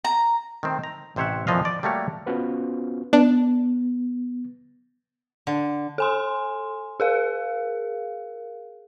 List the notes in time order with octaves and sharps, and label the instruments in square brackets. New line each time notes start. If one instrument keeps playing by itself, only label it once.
[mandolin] A#5
[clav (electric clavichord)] D#3 A3 C4
A#5
A1 C3 C5 C#5 E5 F#5
F2 A#2 E3 F3 D#5 F5
D5
G3 A3 A#3 F#4 C#5
[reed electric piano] B3 C#4 F4 F#4 B4 C5
[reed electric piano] B3 [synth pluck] D4
[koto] D3
[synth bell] A4 G#5 C6
G#4 A#4 F5